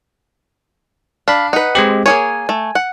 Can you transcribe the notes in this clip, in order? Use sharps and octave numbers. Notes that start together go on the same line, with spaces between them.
D4 F5 B5
D#4 B4 F#5
G#3 C4 G4
A#3 G#4 C#5 G#5
A3
F#5